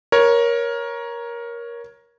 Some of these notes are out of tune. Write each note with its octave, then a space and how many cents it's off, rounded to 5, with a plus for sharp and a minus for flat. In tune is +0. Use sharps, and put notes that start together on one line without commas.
A#4 +15 C#5 +0